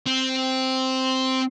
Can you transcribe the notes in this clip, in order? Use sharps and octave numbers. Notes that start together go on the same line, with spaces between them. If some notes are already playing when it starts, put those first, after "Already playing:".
C4